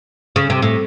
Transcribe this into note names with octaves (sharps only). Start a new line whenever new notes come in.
C#3
C3
A2